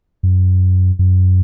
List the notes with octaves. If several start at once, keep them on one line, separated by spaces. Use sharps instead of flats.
F#2
F#2